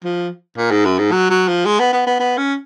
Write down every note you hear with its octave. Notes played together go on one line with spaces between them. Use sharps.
F3
A#2
G#2
F#2
G#2
F#3
F#3
F3
G#3
B3
B3
B3
B3
C#4